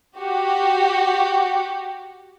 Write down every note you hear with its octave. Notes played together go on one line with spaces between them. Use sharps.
F#4 G4